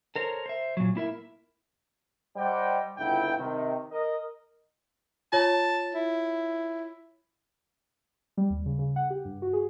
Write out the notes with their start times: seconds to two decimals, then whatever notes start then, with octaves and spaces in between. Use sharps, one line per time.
0.16 A4 A#4 C5 C#5
0.46 C5 E5
0.77 A#2 F#3
0.95 A#3 E4 A#4 E5
2.36 G3 C5 D5 D#5 F#5 G5
2.98 G1 C#2 D3 E4 G5
3.37 C3 D#3
3.92 A#4 D#5
5.33 F4 C#5 A5
5.94 E4
8.37 G3
8.50 D#2
8.66 C#3
8.79 C#3
8.96 F#5
9.10 G4
9.25 G2
9.42 F#4
9.53 G#4